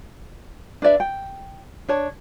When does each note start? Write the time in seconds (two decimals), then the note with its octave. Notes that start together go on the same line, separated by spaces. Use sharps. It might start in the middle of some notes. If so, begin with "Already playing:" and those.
0.82 D4 B4 D5 E5
1.00 G5
1.89 D4 C#5 A5